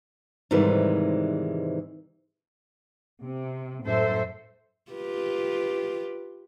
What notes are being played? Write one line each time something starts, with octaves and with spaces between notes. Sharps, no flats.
G#2 C3 D#3 E3 G3 G#3
C3
F#2 A2 A4 C5 E5
F4 G4 B4